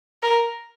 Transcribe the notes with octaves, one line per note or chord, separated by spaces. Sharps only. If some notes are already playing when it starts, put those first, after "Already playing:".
A#4